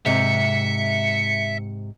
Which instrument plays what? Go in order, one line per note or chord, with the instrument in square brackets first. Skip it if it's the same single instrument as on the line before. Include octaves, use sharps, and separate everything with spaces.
[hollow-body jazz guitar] G#2 C3 [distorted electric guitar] E5 [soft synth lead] C#7